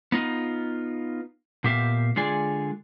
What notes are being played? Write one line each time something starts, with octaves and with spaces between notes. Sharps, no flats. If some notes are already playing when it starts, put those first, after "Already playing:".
B3 D#4 F4
A#2 B3 G4 E5 F5
D3 G#3 F4 G#4 D5 G#5